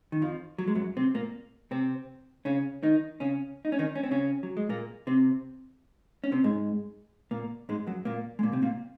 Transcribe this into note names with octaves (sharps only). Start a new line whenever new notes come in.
D#3
F2 F3
F#3
G#3
F#2 F#3
C3 C4
A#2 A#3
C3 C4
C#3 C#4
D#3 D#4
C#3 C#4
D#4
C#4
D#3 D#4
C#4
C4
C#3 C#4
F#3
G#3
A#2 A#3
C3 C4
C#4
C3 C4
G#2 G#3
A#2 A#3
G#2 G#3
F#2 F#3
A#2 A#3
G#3
A#2 A#3
C3 C4
A#2 A#3